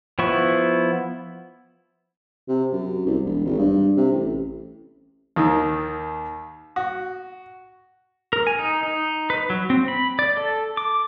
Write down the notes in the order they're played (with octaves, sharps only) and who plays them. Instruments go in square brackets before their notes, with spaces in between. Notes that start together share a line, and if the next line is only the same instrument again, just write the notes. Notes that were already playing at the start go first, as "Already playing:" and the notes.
[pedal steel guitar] F3 B3 E4 C#6
[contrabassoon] C3
F#2
C2
E1
G#1
G2
C3
A1
[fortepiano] D#2 D#3
F#4
[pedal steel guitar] A#4
G#5
D#4
D#4
B4
F#3
C4
B5
D5
A4
D6